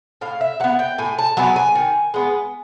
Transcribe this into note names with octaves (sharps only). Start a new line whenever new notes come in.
A2 F5
E5
F#3 B3 F#5
G5
A2 G#5
A5
F#3 B3 G#5
G#5
D#3
G#3 B3